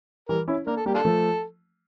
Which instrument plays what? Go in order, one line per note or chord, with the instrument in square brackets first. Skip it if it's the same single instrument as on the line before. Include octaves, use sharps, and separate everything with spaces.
[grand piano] E3 G3 [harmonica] A#4
[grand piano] C#4 E4
[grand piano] A#3 D4 [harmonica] A#4
[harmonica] A4
[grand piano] G3 A#3 [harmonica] G4
[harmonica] D4 F4 A4
[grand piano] F3 A3